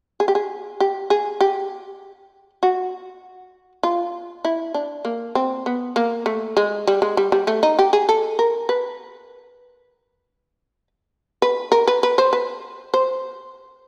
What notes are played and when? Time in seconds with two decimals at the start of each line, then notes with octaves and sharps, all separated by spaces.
0.20 G#4
0.28 G4
0.35 G#4
0.80 G4
1.10 G#4
1.41 G4
2.63 F#4
3.83 F4
4.45 E4
4.74 D4
5.05 A#3
5.35 C4
5.66 B3
5.96 A#3
6.26 A3
6.57 G#3
6.87 G3
7.02 G#3
7.17 G3
7.32 G3
7.47 A3
7.63 D#4
7.79 G4
7.93 G#4
8.09 A4
8.39 A#4
8.69 B4
11.42 B4
11.72 A#4
11.88 B4
12.03 B4
12.18 C5
12.33 B4
12.94 C5